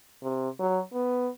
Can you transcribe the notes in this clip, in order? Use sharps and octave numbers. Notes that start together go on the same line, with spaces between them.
C3
F#3
B3